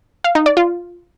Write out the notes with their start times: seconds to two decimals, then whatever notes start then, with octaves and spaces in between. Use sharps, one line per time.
0.24 F5
0.35 D#4
0.46 D5
0.57 F4